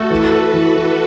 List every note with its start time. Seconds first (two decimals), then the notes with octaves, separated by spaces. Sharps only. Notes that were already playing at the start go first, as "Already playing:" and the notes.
Already playing: A3 F#4 A4
0.11 E3 B4
0.32 A4
0.54 E3
0.76 E3